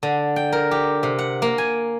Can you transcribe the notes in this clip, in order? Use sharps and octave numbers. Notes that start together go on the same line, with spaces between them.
D3
G5
A#4
G4
C3
F#5
A#3
G#5